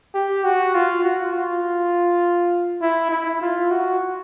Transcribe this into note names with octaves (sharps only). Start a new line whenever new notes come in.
G4
F#4
F4
F#4
F4
E4
E4
F4
F#4